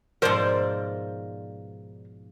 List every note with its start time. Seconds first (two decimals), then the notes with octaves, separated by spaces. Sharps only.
0.22 G#2 B2 F3 A#4 C5 D5